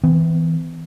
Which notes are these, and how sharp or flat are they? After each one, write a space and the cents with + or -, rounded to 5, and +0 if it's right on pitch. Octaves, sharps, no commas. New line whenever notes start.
E3 -20 B3 +45